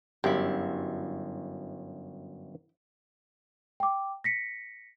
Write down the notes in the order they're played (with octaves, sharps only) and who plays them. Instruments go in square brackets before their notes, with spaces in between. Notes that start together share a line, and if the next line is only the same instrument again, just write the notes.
[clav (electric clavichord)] G1 F#2 [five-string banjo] E4 G4
[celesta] G5 D6
A#6 B6 C#7